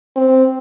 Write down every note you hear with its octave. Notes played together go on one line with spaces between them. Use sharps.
C4